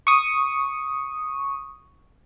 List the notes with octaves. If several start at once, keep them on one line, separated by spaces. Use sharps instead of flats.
C#6 D#6